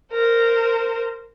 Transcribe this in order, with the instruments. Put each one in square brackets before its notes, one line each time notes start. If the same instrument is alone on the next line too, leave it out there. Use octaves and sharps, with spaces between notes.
[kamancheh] A#4 C5